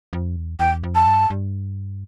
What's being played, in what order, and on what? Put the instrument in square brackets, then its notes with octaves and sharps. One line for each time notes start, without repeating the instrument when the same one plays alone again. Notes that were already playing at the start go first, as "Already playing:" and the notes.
[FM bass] F2
E2
[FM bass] E2 [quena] G5
[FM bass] F2
[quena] A5
[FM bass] G2
G2